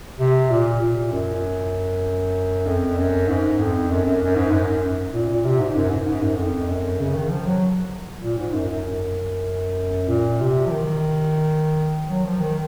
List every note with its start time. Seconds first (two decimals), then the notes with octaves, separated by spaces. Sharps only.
0.19 C3
0.50 A#2
0.81 A#2
1.12 F#2
2.66 F2
2.97 F#2
3.28 G#2
3.59 F2
3.90 F#2
4.06 F#2
4.21 F#2
4.36 G#2
4.51 F#2
5.13 A#2
5.28 A#2
5.44 C3
5.60 G#2
5.76 F#2
5.91 G#2
6.07 G#2
6.22 F#2
6.37 F2
6.69 F#2
6.99 C#3
7.15 D#3
7.29 F3
7.46 F#3
8.22 A#2
8.38 G#2
8.54 F#2
8.69 F#2
10.08 A#2
10.40 C3
10.66 F3
10.71 D#3
12.09 F#3
12.24 F3
12.40 D#3